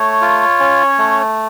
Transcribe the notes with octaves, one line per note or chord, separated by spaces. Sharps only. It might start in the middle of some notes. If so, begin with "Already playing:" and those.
Already playing: A3 C#5
F4
C#4
A3